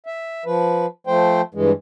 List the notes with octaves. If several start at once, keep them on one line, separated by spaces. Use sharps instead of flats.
E5
F3 B4
F3 A3 C5 G5
G2 E3 G#3